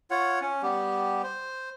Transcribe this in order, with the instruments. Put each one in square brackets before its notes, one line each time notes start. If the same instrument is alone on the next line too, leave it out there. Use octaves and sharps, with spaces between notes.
[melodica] F4 C#5 F#5
C#4
G3 B3 G4
C5